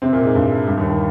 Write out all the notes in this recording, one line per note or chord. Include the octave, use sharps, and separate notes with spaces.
C3 C4
A#2 A#3
G#2 G#3
G2 G3
G2 G3
D#2 D#3
D#3